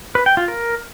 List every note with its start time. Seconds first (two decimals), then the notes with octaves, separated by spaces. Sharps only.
0.15 B4
0.26 G5
0.37 F4
0.48 A#4